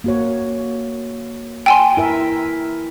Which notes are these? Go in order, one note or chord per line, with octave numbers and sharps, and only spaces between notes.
A#3 F#4 C#5
G5 G#5 C6
E4 A#4 E5